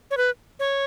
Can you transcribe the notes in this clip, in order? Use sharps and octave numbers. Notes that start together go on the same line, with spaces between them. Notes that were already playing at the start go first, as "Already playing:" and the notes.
C#5
B4
C#5